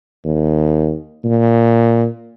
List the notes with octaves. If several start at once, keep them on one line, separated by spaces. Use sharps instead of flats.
D#2
A#2